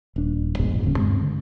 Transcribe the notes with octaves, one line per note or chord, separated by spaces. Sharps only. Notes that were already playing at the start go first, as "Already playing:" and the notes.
D#1 D4
A#1 F2 G#2 B2
D#1 D2 C#3 C#4
G2 G#3 C4
D3